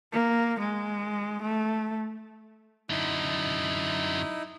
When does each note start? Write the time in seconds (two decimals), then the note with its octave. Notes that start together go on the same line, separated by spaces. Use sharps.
0.12 A#3
0.60 G#3
1.42 A3
2.90 F#2 D3 D#4 E4